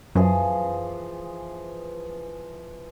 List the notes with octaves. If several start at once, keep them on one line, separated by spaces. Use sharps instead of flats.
F#2 E3 F3 G#4